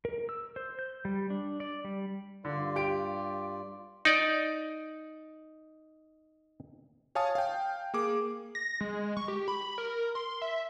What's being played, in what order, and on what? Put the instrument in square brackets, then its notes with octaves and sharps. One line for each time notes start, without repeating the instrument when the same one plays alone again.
[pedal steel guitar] A#4
E6
C5
G6
G3
D4
D5
G3
[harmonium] G2 F4 D5 [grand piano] D3
[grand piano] G4 D7
[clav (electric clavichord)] D#4 D5
[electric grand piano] C#5 F5 G#5 A5 D#6
F5 G5
A#3 G#4 D6
[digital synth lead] A#6
G#3
C#6
G4
B5
A#4
C6
E5